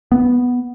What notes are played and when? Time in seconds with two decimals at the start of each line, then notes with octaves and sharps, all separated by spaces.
0.12 B3